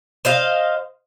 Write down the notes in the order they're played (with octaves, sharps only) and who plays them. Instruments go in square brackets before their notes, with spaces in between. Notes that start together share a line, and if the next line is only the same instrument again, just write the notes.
[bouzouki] C5 D#5 F5